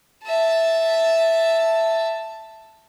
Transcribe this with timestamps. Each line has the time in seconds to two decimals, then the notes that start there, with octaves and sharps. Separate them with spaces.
0.23 E5 A5